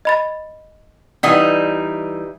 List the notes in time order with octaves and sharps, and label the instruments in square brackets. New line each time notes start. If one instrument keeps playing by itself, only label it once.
[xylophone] D#5 B5 A6
[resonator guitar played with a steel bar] E3 G3 D#4 [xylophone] D5 F#5 D#6